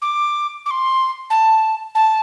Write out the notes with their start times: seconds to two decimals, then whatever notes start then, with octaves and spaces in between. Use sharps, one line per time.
0.02 D6
0.66 D6
0.71 C6
1.30 A5
1.95 A5